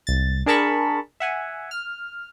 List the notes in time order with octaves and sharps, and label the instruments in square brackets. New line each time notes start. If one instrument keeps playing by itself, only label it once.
[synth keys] C2 A6
D4 G#4 A#4 A5 B5 C#6
E5 F#5 G#5
F6